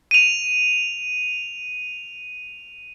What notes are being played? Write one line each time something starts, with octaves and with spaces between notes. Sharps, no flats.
D#7 F7